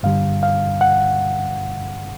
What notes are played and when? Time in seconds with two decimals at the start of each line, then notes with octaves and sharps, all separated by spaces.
0.03 G2 D3 G3 F5
0.43 F5
0.81 F#5